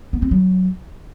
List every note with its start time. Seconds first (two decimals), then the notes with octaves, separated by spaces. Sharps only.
0.13 B3
0.22 C4
0.31 F#3